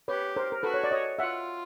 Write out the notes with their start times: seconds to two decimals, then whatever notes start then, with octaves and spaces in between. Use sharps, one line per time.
0.08 G4 B4 C#5
0.36 A#4 C5
0.52 A#4
0.63 F#4 A4 B4
0.74 C#5
0.84 D5
0.91 C#5 D#5
1.19 F4 E5 F#5